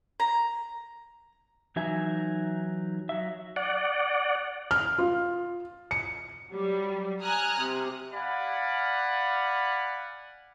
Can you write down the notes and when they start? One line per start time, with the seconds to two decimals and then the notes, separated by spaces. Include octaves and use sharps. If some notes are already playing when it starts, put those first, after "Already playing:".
0.20 A#5
1.76 E3 F#3 D#4 E5 G#5
3.09 F#3 E5
3.56 D5 F#5
4.71 F6
4.98 F4
5.91 C#7
6.50 F#3 G3
7.23 G#5 A#5 D#6 F6 F#6
7.61 C3
8.13 D5 F5 F#5 G#5 B5